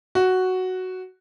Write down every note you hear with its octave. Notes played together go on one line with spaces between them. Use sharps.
F#4